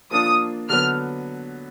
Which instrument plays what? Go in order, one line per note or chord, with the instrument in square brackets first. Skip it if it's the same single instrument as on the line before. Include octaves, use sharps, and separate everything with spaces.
[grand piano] F3 A#3 D4 F4 [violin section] D#6
[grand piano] D3 F#3 B3 [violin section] F6